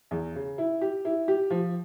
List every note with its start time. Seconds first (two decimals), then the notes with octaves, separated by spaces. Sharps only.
0.11 E2
0.35 C#3
0.58 E4
0.81 G4
1.05 E4
1.28 G4
1.50 F3